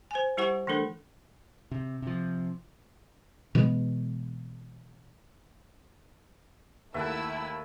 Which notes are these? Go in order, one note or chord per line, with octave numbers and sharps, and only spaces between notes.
C5 G#5
G3 E4 G4 C5 F#5 C#6
E3 A3 D4 A4 A#4
C3
C3 F3
B2 E3 G#3 B3
D#2 A3 E4 E5 F#5 A5 E6